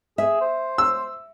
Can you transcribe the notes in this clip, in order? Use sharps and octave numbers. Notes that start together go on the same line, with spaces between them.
G#4 E5
C5
E6